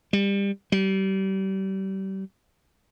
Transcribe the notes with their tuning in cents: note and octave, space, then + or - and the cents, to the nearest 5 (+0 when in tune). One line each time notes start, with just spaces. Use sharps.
G3 +25
G3 -30